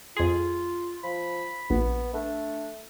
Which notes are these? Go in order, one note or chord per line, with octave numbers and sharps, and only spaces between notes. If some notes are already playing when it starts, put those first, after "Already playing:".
F2 F4 G#4
F3 B5
A#1 B3
A3 D4